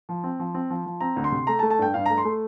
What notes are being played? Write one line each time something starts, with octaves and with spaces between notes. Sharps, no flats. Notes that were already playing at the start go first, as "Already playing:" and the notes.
F3
C4
F3
C4
F3
F3
C4 A#5
D2
C6
C3
A3 A#5
A5
A3
A5
G2 G5
G2 F5
A3 A#5
C6
A3